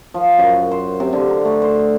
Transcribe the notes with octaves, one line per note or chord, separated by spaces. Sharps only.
F3
F#2
C5
C3
D3
A#5
A3
C5